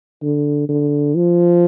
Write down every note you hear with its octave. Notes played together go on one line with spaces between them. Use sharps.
D3
D3
F3